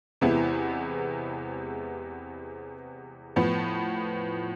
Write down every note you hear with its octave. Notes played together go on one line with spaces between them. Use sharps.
E2 C3 G#3 B3 E4
A2 F3 B3